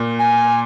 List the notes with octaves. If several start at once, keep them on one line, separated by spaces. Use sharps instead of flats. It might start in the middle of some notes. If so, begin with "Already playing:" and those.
Already playing: A#2
G#5